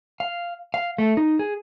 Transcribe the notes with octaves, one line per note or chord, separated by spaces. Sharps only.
F5
F5
A3
D#4
G#4